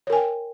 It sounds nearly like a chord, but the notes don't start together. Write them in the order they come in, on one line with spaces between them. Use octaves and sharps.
C#5 A#4 G#5 G5